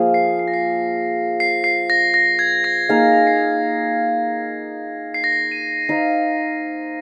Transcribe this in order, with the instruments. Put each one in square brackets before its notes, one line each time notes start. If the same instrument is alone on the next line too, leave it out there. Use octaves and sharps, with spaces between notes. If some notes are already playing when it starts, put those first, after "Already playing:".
Already playing: [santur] F3 A#3 G#4 F5
[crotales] C7
C7
A#6
C7
C7
C7
A#6
A#6
G#6
A#6
[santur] A#3 D#4 G#4 F5
[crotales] C7
C7
A#6
C7
D#7
[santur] D#4 C5 F5